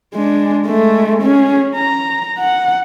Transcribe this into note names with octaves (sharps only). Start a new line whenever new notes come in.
G#3 D4
G#3 A3
C#4 G#4
A#5
F#5